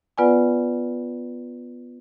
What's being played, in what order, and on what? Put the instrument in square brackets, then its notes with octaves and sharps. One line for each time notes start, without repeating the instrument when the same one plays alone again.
[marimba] B3 F4 B4 D5 F#5 G#5